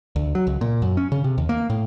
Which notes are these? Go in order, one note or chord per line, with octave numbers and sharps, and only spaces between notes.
D2
F#3
C#2
A#2
F#2
C#4
C#3
C3
D#2
A#3
A2